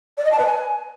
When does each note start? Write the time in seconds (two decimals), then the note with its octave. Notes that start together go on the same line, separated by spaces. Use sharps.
0.17 D5
0.24 D#5
0.31 A5
0.38 B4
0.45 G#5